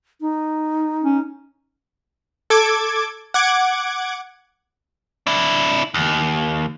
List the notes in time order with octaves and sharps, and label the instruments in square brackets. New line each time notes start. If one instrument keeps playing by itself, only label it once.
[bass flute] D#4
[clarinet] C#4
[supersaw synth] A4 D6 G#6
F#5 D6 G#6
[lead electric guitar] D4 E4
D#2